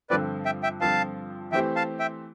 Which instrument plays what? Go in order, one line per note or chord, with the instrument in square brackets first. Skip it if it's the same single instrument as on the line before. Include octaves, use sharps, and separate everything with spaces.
[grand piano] G2 D3 F3 C4 [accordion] B4 D5
[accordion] E5 G5
E5 G5
[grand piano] G2 D3 F3 C4 [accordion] F5 A5
[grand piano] E3 A3 C4 G4 C5 [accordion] E5 G5
[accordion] F5 A5
E5 G5